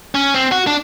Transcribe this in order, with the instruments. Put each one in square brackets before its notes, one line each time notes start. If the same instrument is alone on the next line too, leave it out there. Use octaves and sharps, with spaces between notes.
[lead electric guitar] C#4
C4
F#4
D4